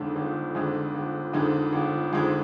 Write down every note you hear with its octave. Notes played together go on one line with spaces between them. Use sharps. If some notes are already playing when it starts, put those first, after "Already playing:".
Already playing: G1 F2 D3 G#3 D#4
G1
F2 D3 G#3 D#4
G1
F2 D3 G#3 D#4
G1
F2 D3 G#3 D#4